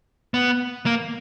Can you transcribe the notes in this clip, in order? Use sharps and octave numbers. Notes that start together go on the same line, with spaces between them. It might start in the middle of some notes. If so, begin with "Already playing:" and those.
B3
A#3